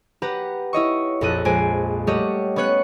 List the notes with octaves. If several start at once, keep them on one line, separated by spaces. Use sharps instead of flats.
G4 B4 F#5 A#5
E4 C#5 D#5 C#6
A#1 F2 A4 D#5 F#6 D#7
A#1 G#3 C5 G#5 D7
G3 A3 G4 C#5 D#5 F#5
B3 C#4 C#5 F#6 C#7